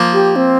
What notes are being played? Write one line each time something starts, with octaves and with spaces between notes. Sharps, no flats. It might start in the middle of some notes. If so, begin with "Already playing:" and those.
Already playing: F3 A#3
G4
C4